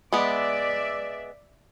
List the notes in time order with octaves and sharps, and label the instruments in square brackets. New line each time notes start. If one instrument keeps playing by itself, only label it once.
[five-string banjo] G#3 B3 [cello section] D5 E5